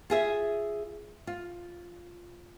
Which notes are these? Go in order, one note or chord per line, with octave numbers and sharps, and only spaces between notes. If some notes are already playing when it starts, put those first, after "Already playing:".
F4 G#4 E5
F4